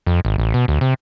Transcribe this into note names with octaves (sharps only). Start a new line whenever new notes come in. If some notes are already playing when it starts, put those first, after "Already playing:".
F2
G#1
A1
B2
D2
C3